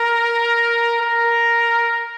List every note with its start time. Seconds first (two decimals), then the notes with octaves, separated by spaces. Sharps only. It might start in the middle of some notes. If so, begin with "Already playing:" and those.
Already playing: A#4
1.01 A#4